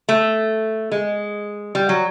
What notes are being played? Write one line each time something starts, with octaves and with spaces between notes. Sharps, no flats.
A3
G#3
G3
F#3